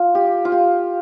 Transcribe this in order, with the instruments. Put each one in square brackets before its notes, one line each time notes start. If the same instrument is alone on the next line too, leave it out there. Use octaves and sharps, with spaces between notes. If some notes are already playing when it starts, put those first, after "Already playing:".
Already playing: [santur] F4
G4
F4
G4